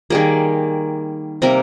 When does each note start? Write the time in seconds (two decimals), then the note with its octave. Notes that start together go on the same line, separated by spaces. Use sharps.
0.10 D#3 G3 A#3 G#4
1.42 C3 G3 A#3 A#4